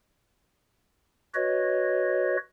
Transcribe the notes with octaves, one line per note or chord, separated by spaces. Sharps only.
F#4 B4 C#5 D#5